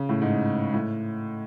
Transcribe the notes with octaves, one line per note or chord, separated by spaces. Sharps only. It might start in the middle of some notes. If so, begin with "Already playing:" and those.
Already playing: C#3
A2
G#2
A2